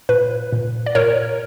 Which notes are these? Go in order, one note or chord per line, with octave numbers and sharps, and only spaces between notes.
A#2 B4
A#2
D5
A#2 A#4 C#5